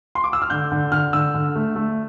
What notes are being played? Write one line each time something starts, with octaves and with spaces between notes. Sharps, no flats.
C6
D6
E6
F6
D3 G6
D3
D3 F6
D3 E6
D3
A3
A3